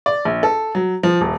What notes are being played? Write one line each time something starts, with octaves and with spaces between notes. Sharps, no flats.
D5
A#1
A4
F#3
F3
D#1